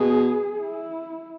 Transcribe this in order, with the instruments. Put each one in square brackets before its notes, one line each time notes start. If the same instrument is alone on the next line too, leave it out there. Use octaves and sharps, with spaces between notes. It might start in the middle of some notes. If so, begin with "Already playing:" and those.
Already playing: [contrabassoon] B2 [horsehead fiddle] G#4
[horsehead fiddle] E4